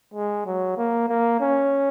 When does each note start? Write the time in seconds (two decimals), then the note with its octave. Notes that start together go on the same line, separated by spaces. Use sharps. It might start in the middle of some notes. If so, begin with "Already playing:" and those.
0.14 G#3
0.46 F#3
0.78 A#3
1.08 A#3
1.40 C#4